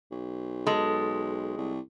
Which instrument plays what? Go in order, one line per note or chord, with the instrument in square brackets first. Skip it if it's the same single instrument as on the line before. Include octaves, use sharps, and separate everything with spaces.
[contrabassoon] B1
[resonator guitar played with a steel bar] G#3 A4
[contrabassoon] C2